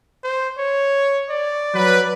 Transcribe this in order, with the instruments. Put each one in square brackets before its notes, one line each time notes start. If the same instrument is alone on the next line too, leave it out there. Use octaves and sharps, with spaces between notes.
[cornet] C5
C#5
D5
[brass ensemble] F#3 B4